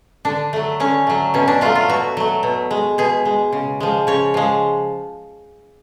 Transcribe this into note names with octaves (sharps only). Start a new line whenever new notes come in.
D3 D4
F#3 A3
D3 C#4
F#3 A3
B2 C#4
D4
F#3 A3 F4
F4
B2 F#4
F#3 A3
B2
G#3
B2 G#4
G#3
C#3
F3 G#3
C#3 C#5
F3 G#3